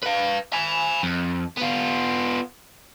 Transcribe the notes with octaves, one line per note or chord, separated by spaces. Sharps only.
B4 F5
G#5 B5
F2
B3 F4